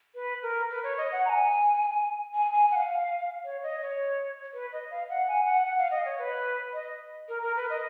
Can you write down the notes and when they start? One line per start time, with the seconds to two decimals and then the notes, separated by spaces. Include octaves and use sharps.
0.15 B4
0.43 A#4
0.70 B4
0.83 C#5
0.98 D#5
1.12 F#5
1.25 A#5
1.29 G#5
2.34 G#5
2.53 G#5
2.72 F#5
2.76 F5
3.44 C#5
3.63 D#5
3.82 C#5
4.54 B4
4.72 D#5
4.91 F5
5.10 F#5
5.28 G#5
5.46 F#5
5.63 F#5
5.78 F5
5.91 D#5
6.05 C#5
6.19 B4
6.73 D#5
7.29 A#4
7.43 A#4
7.56 B4
7.70 D#5